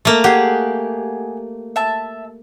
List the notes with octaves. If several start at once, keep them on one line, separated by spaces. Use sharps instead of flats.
A3 A#3
G4 G#4 F#5
E5 A5